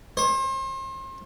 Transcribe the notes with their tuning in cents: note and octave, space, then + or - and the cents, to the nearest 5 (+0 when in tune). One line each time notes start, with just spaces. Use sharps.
C5 +35